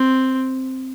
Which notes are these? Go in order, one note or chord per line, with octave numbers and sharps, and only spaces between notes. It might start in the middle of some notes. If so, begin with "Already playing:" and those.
Already playing: C4